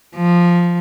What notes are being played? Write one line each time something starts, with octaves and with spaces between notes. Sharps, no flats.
F3